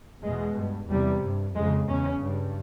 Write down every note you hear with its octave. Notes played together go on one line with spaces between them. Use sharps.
E2 B2 G#3
G2
E2 C3 G3
G2
F2 C#3 G#3
E2 C#3 C#4
G2